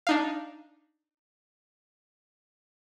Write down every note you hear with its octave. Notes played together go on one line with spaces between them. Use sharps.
D4 D#4 F5